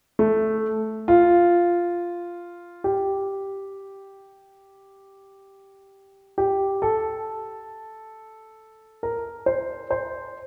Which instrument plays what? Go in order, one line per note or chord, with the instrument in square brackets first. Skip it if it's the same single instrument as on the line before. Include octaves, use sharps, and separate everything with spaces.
[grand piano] A3
F4
G4
G4
A4
A#4
C5
C5